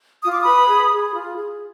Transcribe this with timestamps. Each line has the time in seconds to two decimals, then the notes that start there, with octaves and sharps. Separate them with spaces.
0.23 F4 D#6
0.33 D6
0.42 B4 B5 D#6
0.68 G#4
0.91 G#4
1.13 F4
1.36 G#4